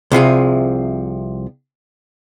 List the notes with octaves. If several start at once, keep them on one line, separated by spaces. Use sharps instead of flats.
C2 C3 F3 G#4